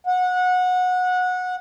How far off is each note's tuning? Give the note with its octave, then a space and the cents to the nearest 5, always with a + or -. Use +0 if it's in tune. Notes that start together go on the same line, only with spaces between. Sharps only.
F#5 -20